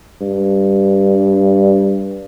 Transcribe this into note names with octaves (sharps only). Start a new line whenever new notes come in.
G2